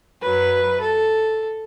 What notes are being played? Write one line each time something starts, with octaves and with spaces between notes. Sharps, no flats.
F#2 F#3 B4
A4